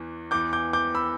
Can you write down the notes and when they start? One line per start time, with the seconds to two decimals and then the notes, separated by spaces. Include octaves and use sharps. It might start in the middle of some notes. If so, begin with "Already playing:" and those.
Already playing: E2 E3
0.31 E2 E3 B3 D6 G6
0.53 D6 G6
0.73 D6 G6
0.95 B5 E6